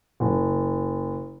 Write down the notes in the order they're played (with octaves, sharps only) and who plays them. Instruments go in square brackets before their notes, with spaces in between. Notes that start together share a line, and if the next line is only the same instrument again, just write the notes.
[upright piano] F#1